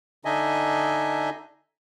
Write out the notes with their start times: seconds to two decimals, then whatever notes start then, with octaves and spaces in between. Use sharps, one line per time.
0.25 D3 D4 D#4 D#5 E5 G#5